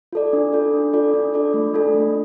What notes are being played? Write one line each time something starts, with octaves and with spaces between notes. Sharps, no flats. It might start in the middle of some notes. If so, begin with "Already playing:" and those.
F4 A4 D5
D4
F4 A4 D5
D4
F4 A4 D5
D4
F4 A4 D5
A3
D4 F4 A4
A3